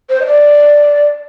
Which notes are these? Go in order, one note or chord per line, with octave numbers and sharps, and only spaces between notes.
C5
D#5
D5